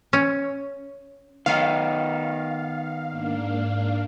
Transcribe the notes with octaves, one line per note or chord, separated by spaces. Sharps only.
C#4
D#3 B3 D#4 F5
G#2 A#3 D4